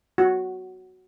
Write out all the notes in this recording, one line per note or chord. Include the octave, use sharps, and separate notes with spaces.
F#4